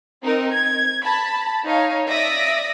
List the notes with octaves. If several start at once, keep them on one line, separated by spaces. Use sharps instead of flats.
C4 D#4 A#4
G#6
A5 B5
D#4 C#5 F5
D5 E5 D#6 A#6